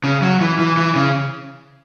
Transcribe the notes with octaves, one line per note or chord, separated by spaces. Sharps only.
C#3
F#3
E3
E3
E3
C#3